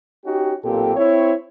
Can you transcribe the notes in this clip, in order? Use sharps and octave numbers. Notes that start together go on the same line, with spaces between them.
C#4 D#4 F#4 G4
B1 A#2 A#3 C4 G4 A4
C4 E4 C#5